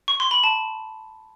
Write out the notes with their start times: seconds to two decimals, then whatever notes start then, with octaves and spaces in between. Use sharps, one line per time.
0.08 C#6
0.20 C6
0.31 B5
0.44 A5